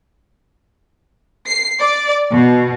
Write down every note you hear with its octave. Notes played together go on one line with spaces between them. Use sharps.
C7
D5
B2